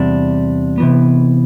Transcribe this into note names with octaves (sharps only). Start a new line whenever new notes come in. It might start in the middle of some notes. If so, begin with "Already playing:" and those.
Already playing: E2 C3 G3 D4
C3 E3 B3